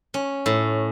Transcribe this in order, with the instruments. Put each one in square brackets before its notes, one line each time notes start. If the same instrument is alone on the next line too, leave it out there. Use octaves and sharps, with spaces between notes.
[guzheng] C#4
A2